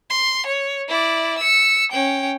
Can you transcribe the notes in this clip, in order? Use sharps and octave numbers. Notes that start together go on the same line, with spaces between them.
C6
C#5
E4 D5
E6 C#7
C#4 G5